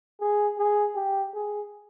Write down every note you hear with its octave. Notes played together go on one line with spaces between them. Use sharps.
G#4
G#4
G4
G#4